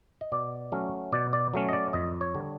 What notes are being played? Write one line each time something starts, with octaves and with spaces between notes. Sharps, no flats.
D#5
B2 D5
F#3 A3 C#4
B2 D5
D5
F#3 A3 C#4
D#5
D5
F2 D#5
C#5
D3 G3